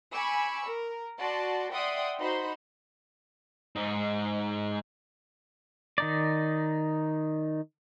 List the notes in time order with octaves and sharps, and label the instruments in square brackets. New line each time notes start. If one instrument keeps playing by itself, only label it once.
[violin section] G#5 B5 C#6 D6 E6
A#4
F#4 D5 A5 C6
D5 E5 F#5 G5 C6 D#6
D#4 F#4 C5 B5 C6
[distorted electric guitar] G#2 D#4
[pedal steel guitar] D#3 D#4 D5